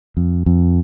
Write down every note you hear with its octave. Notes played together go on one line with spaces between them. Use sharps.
F2
F2